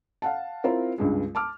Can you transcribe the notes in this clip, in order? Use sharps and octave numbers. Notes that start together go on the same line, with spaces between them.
F5 F#5 A5
C4 E4 F4 A#4
C#2 G2 G#3
A5 D6 F6